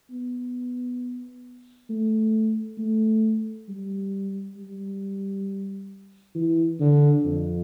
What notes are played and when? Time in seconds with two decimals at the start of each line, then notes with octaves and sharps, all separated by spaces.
0.11 B3
1.90 A3
2.78 A3
3.69 G3
4.58 G3
6.35 E3
6.80 D3
7.25 F2